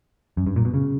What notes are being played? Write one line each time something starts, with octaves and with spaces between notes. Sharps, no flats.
F#2
G2
A#2
B2
C#3